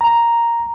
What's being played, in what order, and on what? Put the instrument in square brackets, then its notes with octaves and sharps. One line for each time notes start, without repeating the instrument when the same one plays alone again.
[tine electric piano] A#5